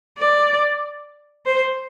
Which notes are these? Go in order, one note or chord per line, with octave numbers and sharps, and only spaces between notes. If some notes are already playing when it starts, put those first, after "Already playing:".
D5
C5